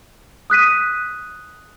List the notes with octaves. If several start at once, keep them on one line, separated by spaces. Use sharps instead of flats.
D#6 F#6 B6 D#7